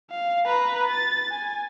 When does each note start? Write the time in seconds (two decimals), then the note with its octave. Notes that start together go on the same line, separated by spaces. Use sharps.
0.11 F5
0.46 B4 A#5
0.87 A6
1.31 G#5